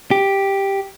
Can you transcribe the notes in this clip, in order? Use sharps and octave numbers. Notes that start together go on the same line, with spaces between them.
G4